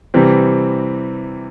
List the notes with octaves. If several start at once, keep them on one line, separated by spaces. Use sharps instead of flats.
C3 E3 G3 C4